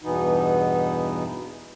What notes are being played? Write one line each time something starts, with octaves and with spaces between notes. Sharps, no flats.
E2 G2 B2 E3 B3 D#4